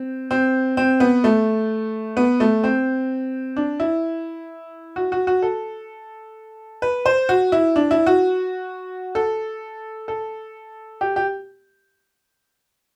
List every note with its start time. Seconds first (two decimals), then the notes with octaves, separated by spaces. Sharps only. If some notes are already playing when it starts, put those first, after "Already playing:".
Already playing: C4
0.31 C4
0.77 C4
1.00 B3
1.24 A3
2.17 B3
2.40 A3
2.64 C4
3.56 D4
3.80 E4
4.96 F#4
5.12 F#4
5.27 F#4
5.42 A4
6.82 B4
7.06 C5
7.29 F#4
7.52 E4
7.76 D4
7.91 E4
8.07 F#4
9.15 A4
10.08 A4
11.01 G4
11.16 G4